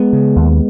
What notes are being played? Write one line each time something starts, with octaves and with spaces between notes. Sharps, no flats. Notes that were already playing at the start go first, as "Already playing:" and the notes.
Already playing: G#3 B3
C#3
D#2